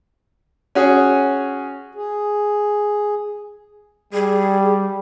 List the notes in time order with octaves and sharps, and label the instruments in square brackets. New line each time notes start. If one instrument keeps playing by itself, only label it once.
[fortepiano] C#4 F#4 G#4
[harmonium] G#4
[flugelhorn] G3 [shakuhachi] G#4